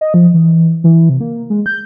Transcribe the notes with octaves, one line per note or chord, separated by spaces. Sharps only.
D#5
F3
E3
E3
C3
A#3
G#3
G6